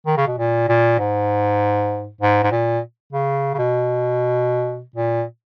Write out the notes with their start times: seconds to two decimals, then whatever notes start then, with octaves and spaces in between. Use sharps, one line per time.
0.07 D#3
0.17 C#3
0.27 B2
0.38 A#2
0.69 A#2
0.99 G#2
2.21 G#2
2.43 G#2
2.52 A#2
3.13 C#3
3.54 C#3
3.59 B2
4.96 A#2